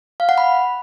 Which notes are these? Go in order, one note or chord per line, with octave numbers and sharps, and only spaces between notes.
F5
F#5
B5